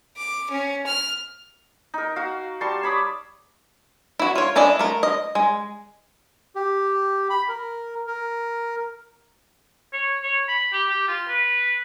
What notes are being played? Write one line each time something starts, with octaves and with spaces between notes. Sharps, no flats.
D6
C#4
F6
D#4 A#4
F#4 F5
G3 A5 C6 C#6
C#5 B5 D6 D#6
E4 F#4
F4 C#5
C#4 D4 E4 D5 D#5
A3 A#4
D#5
G#3
G4
B5
A#4
A#4
C#5
C#5
B5
G4
G4
F4
B4